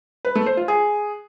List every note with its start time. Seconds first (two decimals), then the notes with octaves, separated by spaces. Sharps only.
0.25 B4
0.35 A3
0.46 C5
0.57 F4
0.68 G#4